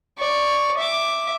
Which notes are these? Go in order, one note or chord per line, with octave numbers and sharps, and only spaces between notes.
D5 C#6
E5 D6